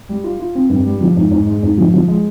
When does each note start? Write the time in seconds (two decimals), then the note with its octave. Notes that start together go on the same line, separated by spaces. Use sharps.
0.09 G3
0.24 F4
0.40 F4
0.55 C4
0.69 G2
0.85 G3
1.01 F3
1.16 G#2
1.32 G#2
1.46 G#3
1.63 G#2
1.78 F3
1.94 F3
2.08 G#3